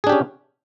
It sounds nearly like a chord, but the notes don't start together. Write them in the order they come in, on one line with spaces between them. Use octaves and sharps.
G#4 D4 G4 C#4